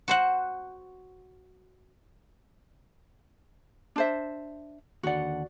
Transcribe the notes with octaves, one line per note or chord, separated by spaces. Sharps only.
F#4 C5 F#5
D4 C5 E5
D#2 D3 F#4 D5 F#5